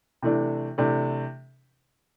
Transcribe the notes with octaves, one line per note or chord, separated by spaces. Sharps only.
C3 E3 A3 D4
C3 E3 A3 D4